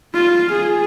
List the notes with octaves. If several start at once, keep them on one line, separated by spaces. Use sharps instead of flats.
F4
G#4